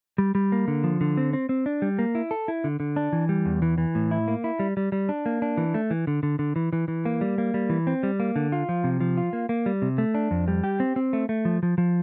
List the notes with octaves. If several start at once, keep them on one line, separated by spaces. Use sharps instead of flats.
G3
G3
A#3
D3
F3
D3
C4
C4
C4
D4
G3
A#3
E4
A4
E4
D3
D3
D4
E3
G3
E2
E3
E3
A2
E4
A#3
E4
G3
G3
G3
D4
A#3
D4
E3
A3
E3
D3
D3
D3
E3
E3
E3
A#3
G3
A#3
G3
E3
C4
G3
A#3
D3
F4
F3
C3
F3
F4
A#3
A#3
G3
C3
A3
D4
F2
G3
G4
C4
C4
A3
A3
F3
F3
F3